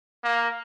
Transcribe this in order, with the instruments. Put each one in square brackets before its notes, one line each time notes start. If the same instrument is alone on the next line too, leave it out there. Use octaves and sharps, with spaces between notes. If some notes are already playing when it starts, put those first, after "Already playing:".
[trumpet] A#3